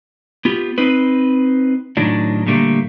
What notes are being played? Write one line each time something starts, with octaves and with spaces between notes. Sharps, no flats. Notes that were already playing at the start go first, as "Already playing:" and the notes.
B3 F4 G4
C4 D#4 B4
A2 D#3 F#3 D4
A#2 D3 G3 A3 A#3